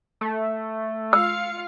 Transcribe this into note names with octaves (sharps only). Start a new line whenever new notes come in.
A3
F4 F5 E6 C#7